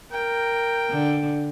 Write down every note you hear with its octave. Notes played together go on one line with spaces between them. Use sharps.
A#4 G5
D3